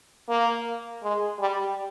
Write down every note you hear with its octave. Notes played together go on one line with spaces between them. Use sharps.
A#3
G#3
G3